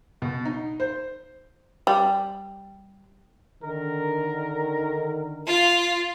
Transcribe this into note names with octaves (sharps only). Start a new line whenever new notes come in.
B2
D#4
C5
G3
D3 D#3 A#4
F4